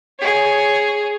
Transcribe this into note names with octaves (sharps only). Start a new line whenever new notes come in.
G#4 C#5